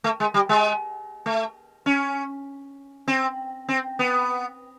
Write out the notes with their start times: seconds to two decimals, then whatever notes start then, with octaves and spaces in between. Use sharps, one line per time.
0.04 A3
0.20 G#3
0.34 G3
0.49 G#3
1.26 A3
1.86 C#4
3.08 C4
3.69 C4
3.99 B3